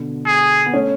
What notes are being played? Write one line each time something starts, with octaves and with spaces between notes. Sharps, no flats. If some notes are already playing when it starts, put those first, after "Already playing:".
Already playing: B2 D3
G#4
B3
A3 C#4